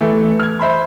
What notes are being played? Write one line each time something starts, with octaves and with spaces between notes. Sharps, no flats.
E3 A3 B3 A4
F6 G#6
C5 E5 B5 C6